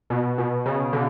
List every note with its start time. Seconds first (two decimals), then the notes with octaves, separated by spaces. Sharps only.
0.10 B2
0.38 B2
0.66 C#3
0.93 D3